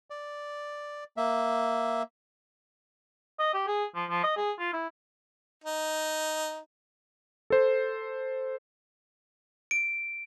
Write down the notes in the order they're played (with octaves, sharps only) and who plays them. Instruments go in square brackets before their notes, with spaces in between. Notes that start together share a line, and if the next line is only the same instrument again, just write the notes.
[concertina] D5
A#3 E5
[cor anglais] D#5
G4
G#4
F3
F3
D#5
G#4
F4
E4
[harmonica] D#4
[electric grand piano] A4 C5
[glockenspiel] D7